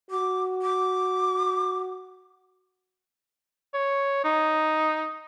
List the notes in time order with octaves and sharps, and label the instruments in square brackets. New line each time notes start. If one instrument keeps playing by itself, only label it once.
[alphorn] F#4 [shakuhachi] D6
[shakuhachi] D6
[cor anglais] C#5
D#4